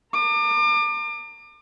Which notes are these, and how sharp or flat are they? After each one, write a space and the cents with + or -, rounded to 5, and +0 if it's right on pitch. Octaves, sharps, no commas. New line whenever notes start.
A#5 -40 D6 +35